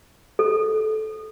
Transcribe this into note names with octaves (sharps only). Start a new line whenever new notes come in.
A4